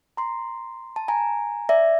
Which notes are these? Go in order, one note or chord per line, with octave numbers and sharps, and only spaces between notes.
A#5 C6
A5
G#5 A#5
D5 E5